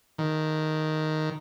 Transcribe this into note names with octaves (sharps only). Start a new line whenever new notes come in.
D#3